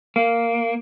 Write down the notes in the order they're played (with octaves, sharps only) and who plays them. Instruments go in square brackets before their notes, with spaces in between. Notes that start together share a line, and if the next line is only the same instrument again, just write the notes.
[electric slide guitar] A#3